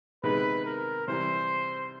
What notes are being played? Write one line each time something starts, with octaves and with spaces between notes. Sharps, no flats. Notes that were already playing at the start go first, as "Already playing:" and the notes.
C3 D#3 G#3 B3 D#4 B4
A#4
C3 E3 G3 C5